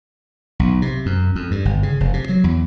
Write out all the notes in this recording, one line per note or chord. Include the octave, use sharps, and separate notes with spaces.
B1
C3
F#2
F2
G2
G1
C#3
F1
C3
F#3
E2